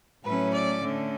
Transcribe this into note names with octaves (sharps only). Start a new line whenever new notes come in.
A2 F#3 A3 C#4 B4
D5
D3 A3 C#4